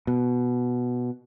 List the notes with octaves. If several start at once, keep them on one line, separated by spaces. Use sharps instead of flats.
B2